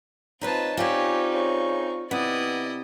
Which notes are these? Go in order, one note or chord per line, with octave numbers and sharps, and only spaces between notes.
C4 D#4 F4 B4 C#5 D#5 A5
C4 C#4 D#4 F4 G4 C#5 D5 E5
C#3 C#6
C3 B3 E4 D5 D#5 D#6